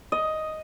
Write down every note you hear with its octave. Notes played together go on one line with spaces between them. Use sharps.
D#5